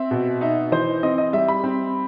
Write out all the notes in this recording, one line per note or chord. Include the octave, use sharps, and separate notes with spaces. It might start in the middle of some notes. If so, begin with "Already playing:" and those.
Already playing: C4 E5
B2
D#4 E5
E3 C5
C4 D#5
D#5
G3 E5
B5
C4